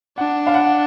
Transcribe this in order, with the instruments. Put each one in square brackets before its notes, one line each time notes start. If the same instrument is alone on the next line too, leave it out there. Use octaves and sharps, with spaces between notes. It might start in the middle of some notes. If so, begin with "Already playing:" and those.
[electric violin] D4 [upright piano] F#5
[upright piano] F5
F#5